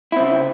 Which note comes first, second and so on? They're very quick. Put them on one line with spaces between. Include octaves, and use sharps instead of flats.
E4 C4 C#3